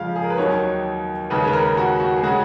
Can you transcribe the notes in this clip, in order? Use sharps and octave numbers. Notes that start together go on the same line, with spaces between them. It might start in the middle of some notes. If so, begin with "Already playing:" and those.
Already playing: F2 C#3 F3 G#3 F5
G#4
A#4
B4
D#2 D#3 F#3 C#5
D#2 C#3 G#3 B4
B4
A#4
F#4
F#4
G#4
C#3 G#3 F#4